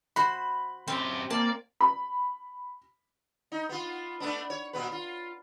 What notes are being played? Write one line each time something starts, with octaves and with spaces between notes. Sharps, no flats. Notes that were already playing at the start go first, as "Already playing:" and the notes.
F#4 C5 B5
F#2 C4 G4
A#3 D5 A5
B5
D#4
B3 F4
A3 B3 D4
C#5
A#2 B3 B4
F4